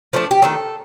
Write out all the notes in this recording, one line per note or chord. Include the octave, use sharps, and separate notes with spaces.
F3 A3 D4
G4
D#3 A3 D4 A4